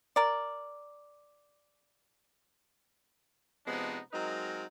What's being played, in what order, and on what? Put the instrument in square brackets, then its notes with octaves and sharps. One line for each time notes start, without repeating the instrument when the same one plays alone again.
[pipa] A#4 D5
[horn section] C3 F3 G#3 B3 D4 D#4
F#3 G#3 C4 D#4 A#4